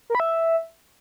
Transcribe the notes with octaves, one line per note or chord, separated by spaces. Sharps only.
A#4
B5
E5